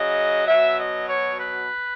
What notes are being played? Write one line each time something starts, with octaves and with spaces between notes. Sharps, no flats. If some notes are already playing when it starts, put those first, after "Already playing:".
Already playing: C#3 F#3 D#5
B2 F#3 E5
D#5
C#5
B4